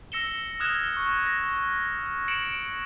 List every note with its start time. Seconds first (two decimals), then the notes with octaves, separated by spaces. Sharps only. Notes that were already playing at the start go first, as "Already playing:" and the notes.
0.12 E6 A#6 C#7 E7 G7
0.60 D#6 F6 F#6 G#6 E7
0.97 C#6
1.27 A#6
2.28 C#7 D7 E7 F#7